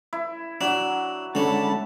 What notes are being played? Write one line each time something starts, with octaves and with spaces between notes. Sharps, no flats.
E4
F#3 D4
D3 G#3 C#4 D4 A5 B5